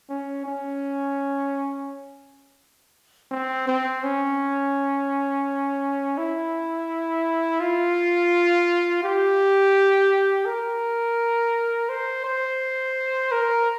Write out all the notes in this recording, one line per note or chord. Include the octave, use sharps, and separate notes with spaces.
C#4
C#4
C4
C4
C#4
E4
F4
G4
A#4
C5
C5
A#4